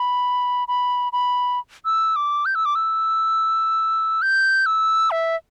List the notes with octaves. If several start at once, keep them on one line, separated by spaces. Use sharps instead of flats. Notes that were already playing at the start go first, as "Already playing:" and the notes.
Already playing: B5
B5
B5
E6
D6
G6
E6
D6
E6
G6
E6
E5